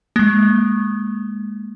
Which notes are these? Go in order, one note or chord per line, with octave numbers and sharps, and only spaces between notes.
G#3 A#3